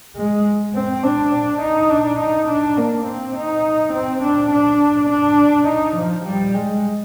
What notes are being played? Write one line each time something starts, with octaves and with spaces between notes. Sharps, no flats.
G#3
C4
D4
D#4
D4
D#4
D4
A#3
C4
D#4
C4
D4
D4
D4
D#4
F3
G3
G#3